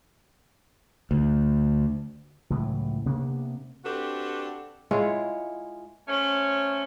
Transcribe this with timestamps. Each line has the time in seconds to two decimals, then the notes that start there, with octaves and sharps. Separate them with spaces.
1.11 D2
2.50 C#2 A2 E3 F#3
3.06 C3 A#3 B3 D4
3.85 C4 D4 F#4 G4 A4 B4
4.91 G#3 E4 F4 C#5
6.08 A3 C4 C#4